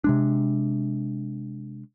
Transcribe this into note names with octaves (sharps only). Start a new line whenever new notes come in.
C3 G#3 D4